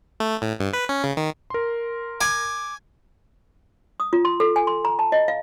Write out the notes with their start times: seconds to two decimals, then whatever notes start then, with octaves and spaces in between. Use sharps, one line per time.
0.20 A3
0.42 A2
0.60 G2
0.73 B4
0.89 C#4
1.04 C#3
1.17 D#3
1.50 A#4 C6
2.21 G#5 D6
4.00 D#6
4.13 F4
4.25 C6
4.40 A4
4.56 G#5
4.67 C6
4.85 A#5
4.99 A5
5.12 D#5
5.28 F5